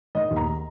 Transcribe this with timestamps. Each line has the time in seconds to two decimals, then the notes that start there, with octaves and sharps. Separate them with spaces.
0.15 D#3 D#5
0.31 D#2
0.36 A#5